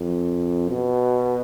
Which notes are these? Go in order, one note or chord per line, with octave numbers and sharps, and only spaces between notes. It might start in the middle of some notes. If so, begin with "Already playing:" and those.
Already playing: F2
B2